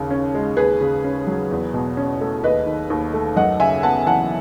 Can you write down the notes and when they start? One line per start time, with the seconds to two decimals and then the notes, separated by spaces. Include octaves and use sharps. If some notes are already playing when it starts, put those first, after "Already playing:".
Already playing: D#2 C#3
0.10 C#4
0.35 G#3
0.57 D#2 G#4 B4
0.81 C#3
1.04 C#4
1.27 F#3
1.51 E2
1.74 B2
1.97 C#4
2.21 A3
2.44 D#2 B4 D#5
2.66 D#3
2.90 D#2
3.13 A3
3.36 F#2 D#5 F#5
3.60 C#3 E5 G#5
3.83 B3 F#5 A5
4.06 E3 F#5 A5